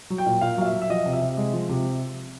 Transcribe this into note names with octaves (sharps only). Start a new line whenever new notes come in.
F#3
G5
A#2
A#2 F5
F#3 F5
E5
F#3
E5
F3 D#5
C3
E5
C3
G#3
F3
C3